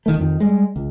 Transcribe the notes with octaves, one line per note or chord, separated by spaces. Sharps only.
D#1 D#3 A3
F2 D#3
G3 G#3
C#2